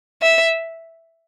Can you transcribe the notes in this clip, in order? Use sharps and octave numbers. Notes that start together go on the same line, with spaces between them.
E5